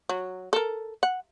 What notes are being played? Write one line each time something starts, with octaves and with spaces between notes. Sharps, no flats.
F#3
A4 A#4
F#5